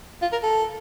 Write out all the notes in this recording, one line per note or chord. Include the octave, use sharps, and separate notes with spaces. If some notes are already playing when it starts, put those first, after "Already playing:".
F4
A#4
A4